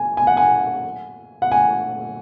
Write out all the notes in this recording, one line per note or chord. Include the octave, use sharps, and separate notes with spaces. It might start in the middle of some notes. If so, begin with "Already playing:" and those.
Already playing: G#5
G#5
F#5
G#5
F#5
G#5